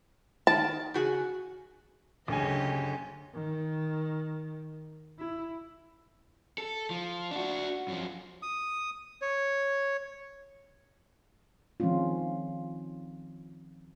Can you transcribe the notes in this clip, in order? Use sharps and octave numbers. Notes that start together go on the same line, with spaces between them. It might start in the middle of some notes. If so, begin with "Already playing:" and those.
D#3 A5
C#3 F#4 G#4
F#1 D2 C#3 C#4 G4 D#5 G#5
D#3
E4
A4
F3
D4 F#4
F#2 F3
D#6
C#5
D#3 F3 G#3 C4 C#4 F4